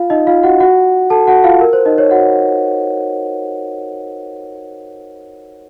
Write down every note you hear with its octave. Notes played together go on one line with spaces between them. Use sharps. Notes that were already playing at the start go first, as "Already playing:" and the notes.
Already playing: F4 F5
D#4 D#5
F4 F5
F#4 F#5
F#4 F#5
A4 A5
F#4 F#5
F4 F5
A#4
C5
D#4 D#5
C#5
F#4 F#5